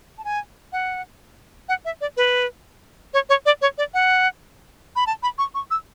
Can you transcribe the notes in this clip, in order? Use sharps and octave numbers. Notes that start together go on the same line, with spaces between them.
A5
G#5
F#5
F#5
E5
D5
B4
C#5
C#5
D5
C#5
D5
F#5
B5
A5
B5
C#6
C#6
E6